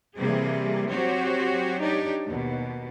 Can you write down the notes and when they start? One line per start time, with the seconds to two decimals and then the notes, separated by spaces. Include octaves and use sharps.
0.17 C3 E3 G3 A#3 G#4
0.91 F#3 C4 F#4 G4 C5 C#5
1.81 D4 D#4 G4 C#5 D5
2.24 D#2 B2